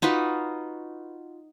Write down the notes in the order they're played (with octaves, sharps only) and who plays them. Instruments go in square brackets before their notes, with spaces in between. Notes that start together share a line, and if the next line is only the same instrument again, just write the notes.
[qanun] D#4 F4 F#4 B4